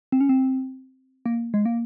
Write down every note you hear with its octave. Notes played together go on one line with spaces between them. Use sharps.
C4
C#4
C4
A#3
G#3
A#3